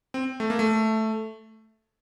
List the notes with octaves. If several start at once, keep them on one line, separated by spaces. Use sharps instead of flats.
C4
A3
A#3
A3